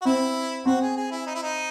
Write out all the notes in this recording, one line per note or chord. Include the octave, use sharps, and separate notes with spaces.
F#4
C4 E4
C4 F#4
G#4
G#4
E4
D#4
E4
D#4